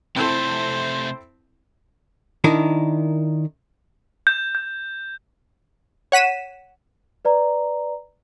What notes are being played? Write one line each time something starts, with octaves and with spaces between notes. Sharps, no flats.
C3 A3 C4 E4 A4 C5
D#3 D4 E4 A#4
G6
G6
C#5 F#5 B6 D#7 E7
B4 D5 A#5